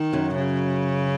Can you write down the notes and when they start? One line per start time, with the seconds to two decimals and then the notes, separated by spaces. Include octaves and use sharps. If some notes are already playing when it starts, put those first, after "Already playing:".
Already playing: D#3
0.13 F#2 F#3
0.36 C#3